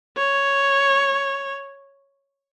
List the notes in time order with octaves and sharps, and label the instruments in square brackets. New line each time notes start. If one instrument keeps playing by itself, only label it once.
[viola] C#5